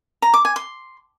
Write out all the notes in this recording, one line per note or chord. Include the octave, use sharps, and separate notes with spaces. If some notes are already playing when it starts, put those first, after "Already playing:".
A#5
D6
G#5
C6